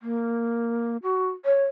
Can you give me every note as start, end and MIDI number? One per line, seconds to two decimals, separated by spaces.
0.01 0.97 58
1.03 1.29 66
1.45 1.63 73